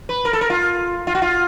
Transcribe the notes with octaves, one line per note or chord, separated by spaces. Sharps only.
B4
A#4
A4
A#4
F4
F4
F#4
F4